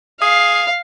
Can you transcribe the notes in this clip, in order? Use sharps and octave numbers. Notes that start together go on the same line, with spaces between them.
G#4 F5